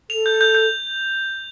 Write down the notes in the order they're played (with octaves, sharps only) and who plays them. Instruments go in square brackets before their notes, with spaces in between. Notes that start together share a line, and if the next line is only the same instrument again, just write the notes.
[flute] A4 [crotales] F7
[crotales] G6
G6
G6